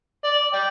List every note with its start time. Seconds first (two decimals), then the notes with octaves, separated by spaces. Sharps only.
0.25 D5
0.54 D5 G5